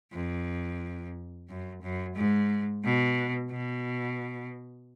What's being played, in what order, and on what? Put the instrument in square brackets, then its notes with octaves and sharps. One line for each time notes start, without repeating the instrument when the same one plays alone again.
[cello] F2
F#2
F#2
G#2
B2
B2